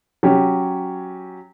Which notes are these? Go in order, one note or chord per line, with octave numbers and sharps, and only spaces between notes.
F#3 C#4 G4